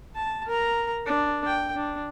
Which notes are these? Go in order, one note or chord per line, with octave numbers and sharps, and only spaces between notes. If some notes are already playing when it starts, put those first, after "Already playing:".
A5
A#4 A#5
D4
G5
D4